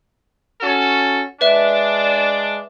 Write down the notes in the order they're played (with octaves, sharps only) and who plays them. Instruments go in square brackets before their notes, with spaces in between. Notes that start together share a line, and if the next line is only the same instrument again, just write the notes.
[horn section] C#4 F#4 A4
[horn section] G#3 D4 [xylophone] B4 E5